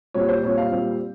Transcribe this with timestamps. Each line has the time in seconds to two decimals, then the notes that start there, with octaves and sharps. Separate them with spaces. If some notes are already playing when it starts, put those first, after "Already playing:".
0.14 A#2 G3 C4 C#5
0.29 C5
0.43 A#2 G3 C4 C#5
0.57 F5
0.72 A#2 G3 C4